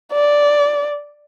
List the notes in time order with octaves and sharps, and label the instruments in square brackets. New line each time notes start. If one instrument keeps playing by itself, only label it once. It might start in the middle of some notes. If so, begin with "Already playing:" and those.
[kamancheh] D5